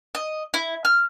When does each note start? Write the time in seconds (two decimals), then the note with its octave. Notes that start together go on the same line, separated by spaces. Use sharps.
0.15 D#5
0.54 E4
0.85 F6